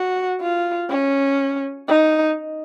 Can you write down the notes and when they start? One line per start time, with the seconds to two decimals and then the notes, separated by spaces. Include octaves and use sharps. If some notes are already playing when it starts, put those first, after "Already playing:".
Already playing: F#4
0.41 F4
0.90 C#4
1.88 D#4